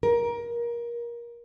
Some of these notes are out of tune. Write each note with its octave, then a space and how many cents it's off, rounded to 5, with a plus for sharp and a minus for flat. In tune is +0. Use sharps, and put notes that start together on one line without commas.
A#4 +20